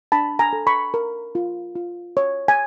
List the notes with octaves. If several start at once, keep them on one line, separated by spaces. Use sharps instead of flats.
D4 A5 B5
G#5 A#5
A4
B5 C#6
A#4
F4
F4
C#5
G#5